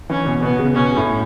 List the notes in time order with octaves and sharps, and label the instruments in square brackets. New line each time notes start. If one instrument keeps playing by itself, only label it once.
[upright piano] E3 [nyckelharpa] C#4
[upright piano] B2
[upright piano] B2 [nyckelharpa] B3
[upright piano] C#3
[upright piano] B2 [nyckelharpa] C#4
[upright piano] A2